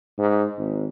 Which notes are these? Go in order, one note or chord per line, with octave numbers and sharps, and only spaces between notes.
G#2
G#1